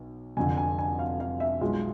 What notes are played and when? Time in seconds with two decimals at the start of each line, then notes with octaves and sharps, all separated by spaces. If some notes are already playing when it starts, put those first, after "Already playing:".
Already playing: B1 B2
0.37 F1 F2 D3 G#5
0.57 G#5
0.79 G#5
0.99 F5
1.20 F5
1.40 E5
1.61 B1 B2 G#3 F4